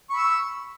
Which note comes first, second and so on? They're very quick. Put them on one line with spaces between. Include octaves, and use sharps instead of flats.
C#6 B5 E6